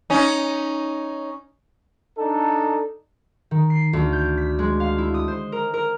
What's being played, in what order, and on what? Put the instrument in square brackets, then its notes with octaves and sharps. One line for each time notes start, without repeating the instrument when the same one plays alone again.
[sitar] C#4 D#4
[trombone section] D4 D#4 A4
[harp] D#3
C7
D2
G6
B6
G#3
F5
E4
D#6
C5
A#4
A#4